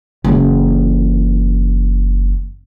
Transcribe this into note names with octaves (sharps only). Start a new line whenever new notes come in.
F#1 E3